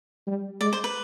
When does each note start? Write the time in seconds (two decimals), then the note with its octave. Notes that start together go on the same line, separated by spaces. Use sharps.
0.27 G3
0.61 G#3 D5
0.73 C5
0.84 B4